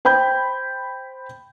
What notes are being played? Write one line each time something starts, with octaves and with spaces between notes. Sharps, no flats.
C5 G5 B5 G6